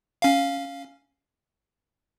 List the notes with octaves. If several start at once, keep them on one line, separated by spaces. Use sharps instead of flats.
C#4 F5